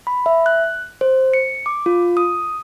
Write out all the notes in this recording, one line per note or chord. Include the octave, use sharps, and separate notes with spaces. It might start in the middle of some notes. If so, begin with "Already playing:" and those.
B5
E5
F#6
C5
C#7
D6
F4
D#6